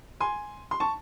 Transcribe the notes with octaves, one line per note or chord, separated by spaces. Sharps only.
G#5 C6
C6
A5 C#6